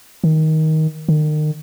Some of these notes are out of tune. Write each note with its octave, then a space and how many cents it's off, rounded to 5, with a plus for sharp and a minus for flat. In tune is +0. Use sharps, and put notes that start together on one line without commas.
D#3 +15
D#3 -35